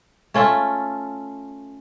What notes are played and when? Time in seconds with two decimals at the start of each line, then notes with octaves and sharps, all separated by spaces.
0.34 A3 C#4 F4 A4